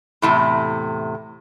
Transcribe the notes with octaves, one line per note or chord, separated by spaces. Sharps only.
E2 A2 C3